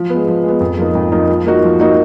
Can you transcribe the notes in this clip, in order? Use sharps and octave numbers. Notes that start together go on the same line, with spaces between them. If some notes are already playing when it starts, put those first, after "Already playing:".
Already playing: F3
B3
G#3
F3
G#3 B3
F2
F3 A#3 D#4
F2
F3 A#3 D#4
F3
A#3 D#4 F#4
F3
A#3 D#4 F#4